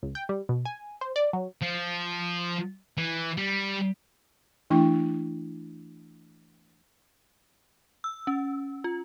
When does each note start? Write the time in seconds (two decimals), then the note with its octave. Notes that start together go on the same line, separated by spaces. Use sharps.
0.03 C#2
0.15 G5
0.29 G3
0.49 B2
0.65 G#5
1.01 C5
1.16 D5
1.33 F#3
1.62 F3
2.97 E3
3.37 G3
4.70 E3 A3 D4 E4 G5 C#6
8.04 E6
8.27 C#4
8.84 F4